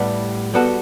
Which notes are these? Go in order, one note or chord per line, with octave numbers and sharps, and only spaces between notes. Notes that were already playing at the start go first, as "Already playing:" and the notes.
Already playing: A2 G3 B3
G3 B3 F#4 A4